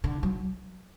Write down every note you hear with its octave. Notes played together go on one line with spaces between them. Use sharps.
D3
F#3